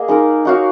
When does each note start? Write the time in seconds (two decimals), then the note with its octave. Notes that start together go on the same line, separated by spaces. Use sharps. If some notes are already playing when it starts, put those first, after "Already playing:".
Already playing: A#3 G#4 D#5
0.08 G#3 D#4 A#4
0.45 D#4 F#4 C#5 F5